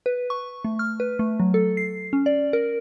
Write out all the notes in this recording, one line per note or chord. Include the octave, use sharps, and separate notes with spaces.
B4
C#6
A3
F6
B4
A3
F#3
A4
C7
C#4
D5
A#4